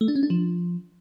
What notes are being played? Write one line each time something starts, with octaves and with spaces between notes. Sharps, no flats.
A3
D4
C#4
D4
F3